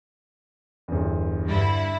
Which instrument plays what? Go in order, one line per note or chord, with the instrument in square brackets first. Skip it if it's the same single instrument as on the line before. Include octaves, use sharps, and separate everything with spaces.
[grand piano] G1 E2
[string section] G2 D3 E4